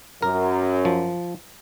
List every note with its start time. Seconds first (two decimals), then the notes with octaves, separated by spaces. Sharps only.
0.22 F#2 A#4
0.85 F3